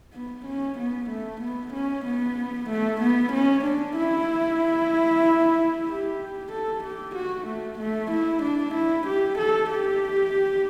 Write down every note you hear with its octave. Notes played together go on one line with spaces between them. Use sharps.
B3
C#4
B3
A3
B3
C#4
B3
A3
B3
C#4
D4
E4
G4
A4
G4
F#4
A3
A3
E4
D4
E4
G4
A4
G4